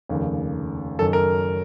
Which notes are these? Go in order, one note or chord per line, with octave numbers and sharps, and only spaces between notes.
F1 D#2 C#3
F#1 F#2 D#3 A4
A#4